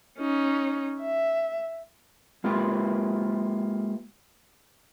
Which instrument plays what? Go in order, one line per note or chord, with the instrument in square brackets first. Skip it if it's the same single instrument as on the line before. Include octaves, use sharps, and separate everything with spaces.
[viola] C#4 D#4
E5
[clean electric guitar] G#3 A#3 F4 G4 B4